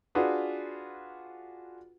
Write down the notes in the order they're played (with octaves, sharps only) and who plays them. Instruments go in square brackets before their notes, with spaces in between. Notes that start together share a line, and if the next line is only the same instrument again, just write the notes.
[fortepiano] D4 F4 F#4 G#4 B4